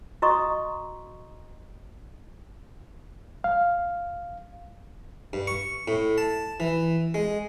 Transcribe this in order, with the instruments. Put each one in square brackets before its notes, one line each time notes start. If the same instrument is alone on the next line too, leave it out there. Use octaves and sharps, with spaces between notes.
[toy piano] F#4 D#5 A#5 C6 C#6 D#6
[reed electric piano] F5
[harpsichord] G2
C#6
A2
A5
E3
G#3